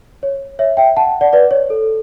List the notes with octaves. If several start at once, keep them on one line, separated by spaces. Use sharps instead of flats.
C#5
C#5 E5
E5 G5
F#5 A5
D5 F#5
B4 D5
C#5
A4